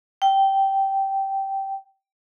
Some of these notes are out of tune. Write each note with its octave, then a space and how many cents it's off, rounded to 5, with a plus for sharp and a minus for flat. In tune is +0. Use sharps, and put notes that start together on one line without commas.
G5 -10